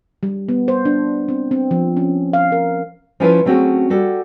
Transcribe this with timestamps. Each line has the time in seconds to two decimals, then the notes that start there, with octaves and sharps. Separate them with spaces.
0.23 G3
0.49 B3
0.68 C5
0.85 D4
1.29 C4
1.51 C4
1.71 F3
1.97 C#4
2.33 F5
2.52 A#4
3.20 F3 C#4 E4 F4 B4 C#5
3.45 F#3 A3 C4 C#4 F#4 G#4
3.90 G3 F#4 A4